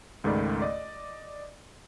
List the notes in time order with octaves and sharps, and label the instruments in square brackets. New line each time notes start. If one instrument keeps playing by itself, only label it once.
[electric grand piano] C#2 G#2 D#3 A3 D5 B5
D5 D#5